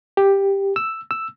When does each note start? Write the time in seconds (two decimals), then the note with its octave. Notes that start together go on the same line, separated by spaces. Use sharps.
0.17 G4
0.76 E6
1.11 E6